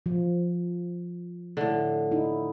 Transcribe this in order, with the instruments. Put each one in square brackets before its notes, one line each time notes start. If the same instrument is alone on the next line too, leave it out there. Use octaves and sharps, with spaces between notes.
[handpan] F3
[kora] A2 D3
[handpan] D#4 E4